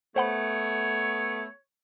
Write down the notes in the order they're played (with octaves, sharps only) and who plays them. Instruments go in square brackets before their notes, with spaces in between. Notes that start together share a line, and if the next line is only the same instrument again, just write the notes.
[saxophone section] A3 B3 [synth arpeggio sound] C5 F#5 B5 [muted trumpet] C#5